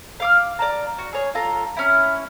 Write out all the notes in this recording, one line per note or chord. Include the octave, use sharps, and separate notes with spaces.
F5 D6 F6
D5 A5 A#5
F#4
G#4 C#5
F4 A4 A#5
C#4 E4